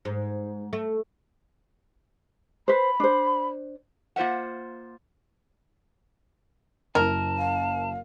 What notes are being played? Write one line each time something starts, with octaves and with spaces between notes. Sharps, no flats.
G#2
A3
B4 C5 B5
D4 C5
A#3 F4 C5 E5 F#5
F#1 F#2 E4 A#4 A5
F5